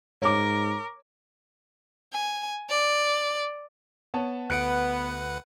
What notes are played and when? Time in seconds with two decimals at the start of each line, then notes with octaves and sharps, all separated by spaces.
0.22 G#2 A#4 C#5 D6
2.13 G#5
2.69 D5
4.14 B3 C#5 A5
4.50 D2 B3 B4 F#5 F#6 C#7 D7